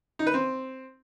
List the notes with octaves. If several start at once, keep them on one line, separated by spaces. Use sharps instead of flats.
D#4
B4
C4